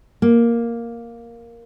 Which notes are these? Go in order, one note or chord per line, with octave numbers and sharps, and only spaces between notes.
A#3